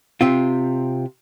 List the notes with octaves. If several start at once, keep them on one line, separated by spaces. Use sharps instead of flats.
C3 C4 F4